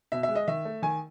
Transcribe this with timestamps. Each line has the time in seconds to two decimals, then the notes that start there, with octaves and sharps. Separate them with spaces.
0.12 B2 E5
0.23 E5
0.29 G#3
0.35 D#5
0.48 D#3 E5
0.65 A3
0.82 D#3 G#5